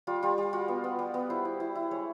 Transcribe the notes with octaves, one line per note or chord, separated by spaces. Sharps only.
G3 F4
G3 F4
G3
F4 F#4
B3
B3
G3
B3
E4 C5
E4
E4
E4
G#3 C#5